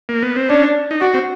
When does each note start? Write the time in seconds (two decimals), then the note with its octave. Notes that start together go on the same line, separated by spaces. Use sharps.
0.09 A#3
0.23 B3
0.36 C4
0.50 C#4 D4
0.91 D#4
1.01 D4 F#4
1.14 C4